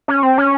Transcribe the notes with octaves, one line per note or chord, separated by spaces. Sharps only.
C#4
C4
C#4